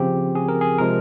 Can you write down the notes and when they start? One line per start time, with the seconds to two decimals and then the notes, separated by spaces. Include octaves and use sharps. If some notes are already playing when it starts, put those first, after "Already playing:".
Already playing: C#3 F3 C4 G4
0.35 G#4
0.49 A#4
0.61 G#4
0.78 C3 F3 G#3 A#4